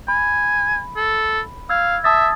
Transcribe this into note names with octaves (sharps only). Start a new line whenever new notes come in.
G#5 B5
A4
F5 E6 G#6
E5 A5 D#6 A6